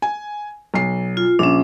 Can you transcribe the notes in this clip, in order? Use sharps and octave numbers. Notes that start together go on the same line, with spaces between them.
G#5
B1 C7
F4
A#1 C#4 D4